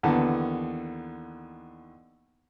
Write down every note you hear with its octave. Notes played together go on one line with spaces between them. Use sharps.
D#2 D3 E3 B3 A5